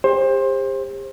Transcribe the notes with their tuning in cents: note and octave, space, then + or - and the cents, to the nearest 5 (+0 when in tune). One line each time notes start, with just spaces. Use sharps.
G4 +40 C5 +25